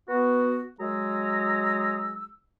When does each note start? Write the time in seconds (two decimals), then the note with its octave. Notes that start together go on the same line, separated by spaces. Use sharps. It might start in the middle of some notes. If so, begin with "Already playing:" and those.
0.09 B3 F#4
0.80 F#3 G#3 G#4 A#5 E6